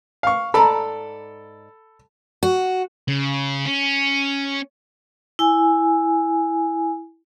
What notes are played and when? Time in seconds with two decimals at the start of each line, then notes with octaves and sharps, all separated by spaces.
0.23 F5 C#6
0.54 G#2 A4 D5 A#5 B5
2.43 F#4
3.08 C#3
3.66 C#4
5.39 E4 G#5